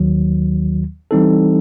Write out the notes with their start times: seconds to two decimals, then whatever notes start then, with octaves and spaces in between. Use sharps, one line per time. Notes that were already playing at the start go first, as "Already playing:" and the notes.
Already playing: D#2 D#3 F#3
1.11 E3 G3 C4 D#4 A4